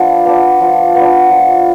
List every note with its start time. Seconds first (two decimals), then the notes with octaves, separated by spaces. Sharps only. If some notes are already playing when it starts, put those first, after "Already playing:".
Already playing: F3 B3 D4
0.25 B3 D4
0.60 F3
0.95 B3 D4
1.30 F3